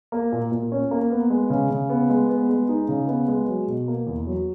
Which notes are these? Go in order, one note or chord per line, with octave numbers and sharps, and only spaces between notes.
A#3
A#2
A#2
C#4
A#3
B3
G#3
C#3
C#3
B3
G#3
B3
G#3
D#4
C#3
B3
G#3
F#3
B2
A#3
E2
F#3